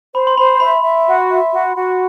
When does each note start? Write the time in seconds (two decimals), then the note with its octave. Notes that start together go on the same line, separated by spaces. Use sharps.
0.14 C5 B5
0.27 C6
0.37 C5 B5
0.60 E5 B5
0.83 E5
1.07 F#4
1.30 E5
1.52 F#4
1.76 F#4